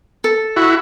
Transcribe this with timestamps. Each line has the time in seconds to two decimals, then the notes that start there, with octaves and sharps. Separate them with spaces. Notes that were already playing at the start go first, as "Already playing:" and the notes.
0.24 A4
0.56 E4 F#4